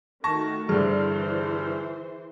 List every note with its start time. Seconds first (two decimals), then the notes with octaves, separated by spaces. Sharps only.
0.24 D#3 A3 F#4 A5 C#6 A#6
0.69 G2 D3 E3 G#4 C5